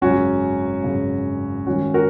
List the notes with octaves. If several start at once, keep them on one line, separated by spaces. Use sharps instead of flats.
G#1 F#2 C#3 C#4 F#4
G#1 F#2 C#3
G#1 G#2 D#3 C#4 F#4
F#4 A#4